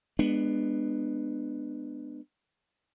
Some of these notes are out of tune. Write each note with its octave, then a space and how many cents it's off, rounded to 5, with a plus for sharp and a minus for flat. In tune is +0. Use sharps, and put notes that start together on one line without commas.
G#3 -5 B3 +0 D4 +25